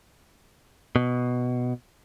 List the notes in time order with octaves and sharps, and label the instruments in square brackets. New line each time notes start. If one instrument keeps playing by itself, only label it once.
[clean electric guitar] B2